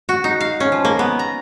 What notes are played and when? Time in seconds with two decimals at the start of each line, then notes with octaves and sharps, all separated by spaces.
0.09 F#4
0.24 D#4
0.40 F5
0.60 C#4
0.72 F3
0.85 A#3
0.99 B3
1.19 A#5